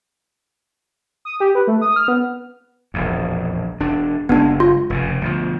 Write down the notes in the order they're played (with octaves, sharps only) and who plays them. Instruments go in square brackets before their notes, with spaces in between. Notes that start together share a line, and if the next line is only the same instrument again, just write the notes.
[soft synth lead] D#6
G4
B4
A3
D#6
F6
B3
[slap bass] E1 A#1 F2
E1 D4
[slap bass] F#1 G#3 [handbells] B3 D4
[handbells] F4
[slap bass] F1 F#2 C#3
D2 B2 F3